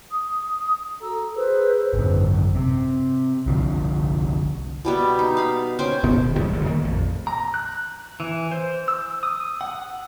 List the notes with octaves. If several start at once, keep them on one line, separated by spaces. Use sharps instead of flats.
D#6
F#4 A4 A#5 E6
G#4 B4 C5 E6
G#1 F#2
C3
C2 D3 F3
B2 G3 B3
D#4
F5 B5
C#4 C5 G5 G#5
D1 B2 B3
E1 D#3
B1 E3 G3 A3
F#1 D2 G2 D#3
D#3 E3 A3 A#3
A#1 F2
A#5
F#6
E3
C5
E6
D#6
F#5